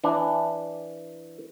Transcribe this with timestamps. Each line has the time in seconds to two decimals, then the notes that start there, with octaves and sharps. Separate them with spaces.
0.04 E3 D4